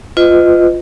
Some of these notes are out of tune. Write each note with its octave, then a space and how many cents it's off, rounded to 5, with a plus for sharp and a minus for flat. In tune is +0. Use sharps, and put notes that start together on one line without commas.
F4 +0 B4 +40 D#5 +0